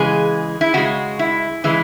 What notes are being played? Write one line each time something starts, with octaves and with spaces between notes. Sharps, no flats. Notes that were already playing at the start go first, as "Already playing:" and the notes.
Already playing: C#3 E3 G#3 G#4
E4
C#3 G#3 F#4
E4
C#3 E3 G#3 E4